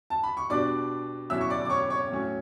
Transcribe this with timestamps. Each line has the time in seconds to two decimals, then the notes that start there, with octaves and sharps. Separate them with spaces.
0.10 A5
0.23 B5
0.37 C#6
0.50 B2 G3 B3 D4 D5 D6
1.30 B2 F#3 C#4 E4 E5 E6
1.41 C#6
1.50 D5 D6
1.65 D6
1.70 C#5 C#6
1.90 C#5 C#6
2.11 A2 F#3 C#4